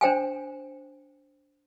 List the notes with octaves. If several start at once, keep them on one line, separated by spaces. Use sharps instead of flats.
D4 C5 G5 G#5